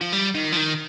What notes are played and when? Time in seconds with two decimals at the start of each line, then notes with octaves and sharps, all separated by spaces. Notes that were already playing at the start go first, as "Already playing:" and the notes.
0.01 F3
0.13 G3
0.35 D#3
0.52 F3
0.57 D#3